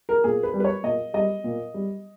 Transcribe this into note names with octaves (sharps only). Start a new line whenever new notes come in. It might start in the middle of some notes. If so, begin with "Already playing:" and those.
A#4
A#2 G#4
B4
G3
B4
C#5
A#2 D#5
G3 D#5
A#2
G3